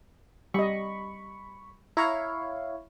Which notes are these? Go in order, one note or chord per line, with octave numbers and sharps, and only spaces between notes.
G3 D#5 B5 C#6
E4 C#5 F5 A#5